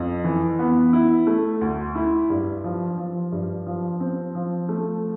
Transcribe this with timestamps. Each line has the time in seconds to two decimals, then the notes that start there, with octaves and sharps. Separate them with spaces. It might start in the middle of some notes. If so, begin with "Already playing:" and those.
Already playing: F2
0.24 E3
0.59 B3
0.93 E4
1.27 A3
1.61 D2
1.95 E4
2.30 G2
2.64 F3
2.97 F3
3.32 G2
3.67 F3
4.00 C4
4.35 F3
4.69 A3